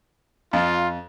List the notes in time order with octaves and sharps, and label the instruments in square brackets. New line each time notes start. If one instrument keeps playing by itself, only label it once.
[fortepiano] F2 [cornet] F4